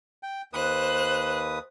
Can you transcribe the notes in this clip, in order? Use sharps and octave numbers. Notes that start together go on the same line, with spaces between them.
G5
D#2 B4 C5 D#6 F#6